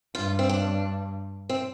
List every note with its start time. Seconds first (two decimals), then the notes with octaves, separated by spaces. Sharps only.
0.15 G2 F4
0.39 C4
0.49 D4
1.49 C4